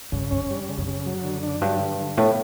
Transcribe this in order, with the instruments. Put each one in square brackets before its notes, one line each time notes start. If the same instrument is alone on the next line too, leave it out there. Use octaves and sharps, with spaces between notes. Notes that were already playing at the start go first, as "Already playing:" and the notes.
[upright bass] G2 [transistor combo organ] C#3
[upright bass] F#2 [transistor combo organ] C#4
[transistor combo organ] G3
C#3
[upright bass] F#2
[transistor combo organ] C#3
F#3
D3
D4
[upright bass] G2 [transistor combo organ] F#3
[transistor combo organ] D3
D3
[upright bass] A2 [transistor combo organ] B3